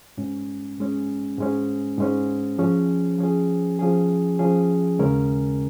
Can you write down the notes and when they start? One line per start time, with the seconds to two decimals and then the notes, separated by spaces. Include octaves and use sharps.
0.18 G#2 G#3 C#4
0.78 G#2 G#3 C#4
1.38 G#2 G#3 C#4
1.98 G#2 G#3 C#4
2.58 F3 C#4 G#4
3.18 F3 C#4 G#4
3.79 F3 C#4 G#4
4.39 F3 C#4 G#4
4.99 D#2 C#3 G#3 C#4 A#4